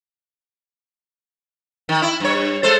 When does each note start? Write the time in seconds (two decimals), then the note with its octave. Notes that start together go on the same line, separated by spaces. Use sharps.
1.89 D#3
2.02 E4
2.20 G2 C#5
2.63 G#3 A4 C5